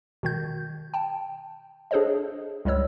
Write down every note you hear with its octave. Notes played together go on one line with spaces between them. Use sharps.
B2 D#3 G6
G5 A5
D4 G#4 A4 C5 C#5 D#5
C#2 G3 G#3 C#5 E6